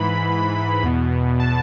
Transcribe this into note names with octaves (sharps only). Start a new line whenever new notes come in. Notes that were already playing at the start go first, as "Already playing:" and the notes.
Already playing: G#2 E3 B5
E2 B2
A5